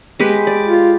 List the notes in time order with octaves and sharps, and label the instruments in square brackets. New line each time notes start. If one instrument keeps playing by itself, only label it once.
[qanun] G#3 G4 B4
D5
[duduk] F4